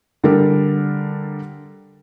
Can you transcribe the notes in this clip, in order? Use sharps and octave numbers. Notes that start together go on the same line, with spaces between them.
D3 G3 A4 A#4